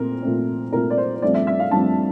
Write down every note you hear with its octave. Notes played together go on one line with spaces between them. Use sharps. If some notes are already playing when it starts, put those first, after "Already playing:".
Already playing: A#2 A3 C4 A#4
A#2 A3 C4
A#2 A3 C4 A#4
D5
C5
C5
G2 F3 A3 C4 D5
E5
E5
F5
G2 F3 A3 C4 A5